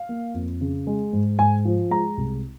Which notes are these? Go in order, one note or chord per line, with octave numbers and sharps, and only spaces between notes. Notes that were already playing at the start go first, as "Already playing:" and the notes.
Already playing: F5
A#3
F2
C#3
G#3
G#2
G#2 G#5
F3
G#3 A#5
C2